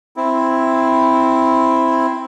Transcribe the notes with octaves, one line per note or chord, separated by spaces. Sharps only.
C4 E4